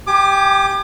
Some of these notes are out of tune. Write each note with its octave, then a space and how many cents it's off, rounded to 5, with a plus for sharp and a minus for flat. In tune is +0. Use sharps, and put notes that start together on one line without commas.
G4 +0 G#5 +10 D6 +35